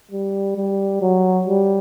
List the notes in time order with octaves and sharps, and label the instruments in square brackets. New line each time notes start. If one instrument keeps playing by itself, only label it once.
[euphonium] G3
G3
F#3
G3